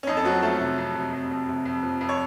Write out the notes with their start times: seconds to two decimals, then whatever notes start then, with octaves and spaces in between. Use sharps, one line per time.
0.03 C#4
0.07 F2 D#4
0.17 A4
0.25 F3 F#3 F#4
0.42 F3 A3 A4
0.60 C3
0.78 F2
0.95 C3
1.13 F2
1.31 F2
1.49 C3
1.65 F2
1.83 F3
2.01 F2
2.09 C#5